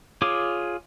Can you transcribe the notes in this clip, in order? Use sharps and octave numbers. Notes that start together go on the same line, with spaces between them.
F4 G#4 C#5 D6